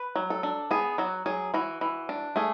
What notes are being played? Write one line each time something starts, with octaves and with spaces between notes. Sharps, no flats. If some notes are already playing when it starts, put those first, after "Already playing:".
Already playing: B4
F#3
A4
D4
B3 G#4
F#3 F#4
F#3 G#4
E3 F#4
E3
D4
A3 G#4